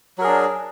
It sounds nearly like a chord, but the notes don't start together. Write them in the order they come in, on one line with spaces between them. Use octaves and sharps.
F#3 A#4 G#4 D4